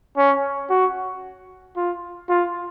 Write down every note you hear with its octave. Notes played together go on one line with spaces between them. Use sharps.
C#4
F#4
F4
F4